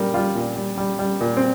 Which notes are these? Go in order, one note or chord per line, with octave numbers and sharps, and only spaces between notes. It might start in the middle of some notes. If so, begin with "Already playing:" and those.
Already playing: A#2 G3 A#4
G3 F4
A#2
G3
G3
G3
A#2
C4